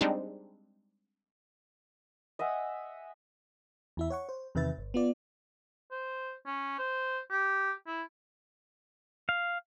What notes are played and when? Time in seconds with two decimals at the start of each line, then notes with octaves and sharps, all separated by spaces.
0.01 G3 G#3 C4 D4 D#4
2.39 D#5 E5 F#5 G#5
3.97 E2 E4 E5
4.10 C#5 F#5 C#6
4.29 C5
4.55 E2 C3 D#3 B4 E5 A6
4.78 G1
4.94 B3 F4 D5
5.91 C5
6.46 C#4
6.78 C5
7.31 G4
7.87 E4
9.29 F5